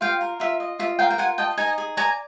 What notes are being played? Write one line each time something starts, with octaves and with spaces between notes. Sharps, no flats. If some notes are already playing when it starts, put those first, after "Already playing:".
F4 F5 G5
A#4
F4 E5
D#5
F4 E5
A#4 F5 G5
G5
F4 F#5 G#5
D#5 G5 A5
D#4 G#5 A#5
G#4
D5 G#5 A#5